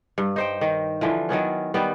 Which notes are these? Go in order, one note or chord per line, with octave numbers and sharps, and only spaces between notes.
G2
D#4 C5 G5
D#3
D3 E3 F3
D#3 F#3 B3 C#4
D#3 G3 B3